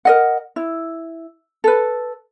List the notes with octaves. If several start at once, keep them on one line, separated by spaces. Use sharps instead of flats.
A#4 D#5 F#5
E4
A4 B4